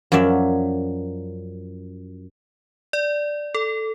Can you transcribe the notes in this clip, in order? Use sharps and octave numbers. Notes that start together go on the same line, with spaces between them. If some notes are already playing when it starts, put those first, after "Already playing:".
F#2 F3 F#3 D5 E5
D5
A4